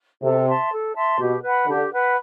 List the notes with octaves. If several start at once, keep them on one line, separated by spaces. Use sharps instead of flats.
C3 A4
E5 A5 C6
A4
E5 A5 C6
B2 G4
B4 F#5 B5
D3 G4
B4 F#5 B5